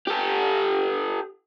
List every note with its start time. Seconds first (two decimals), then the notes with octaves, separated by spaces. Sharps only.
0.07 G4 A4